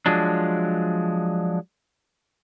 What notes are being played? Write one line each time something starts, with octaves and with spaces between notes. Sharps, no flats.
F3 F#3 G#3 D4